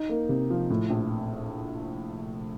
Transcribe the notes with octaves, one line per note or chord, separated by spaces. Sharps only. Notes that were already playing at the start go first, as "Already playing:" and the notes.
Already playing: D#4
A#3
C3
F3
A2
A#1